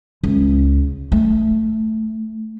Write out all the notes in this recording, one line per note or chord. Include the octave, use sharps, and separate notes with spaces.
C#2
A3